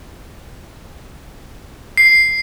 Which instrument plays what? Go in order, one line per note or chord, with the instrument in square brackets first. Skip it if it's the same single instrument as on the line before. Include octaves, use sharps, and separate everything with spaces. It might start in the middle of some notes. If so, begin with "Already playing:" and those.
[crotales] C7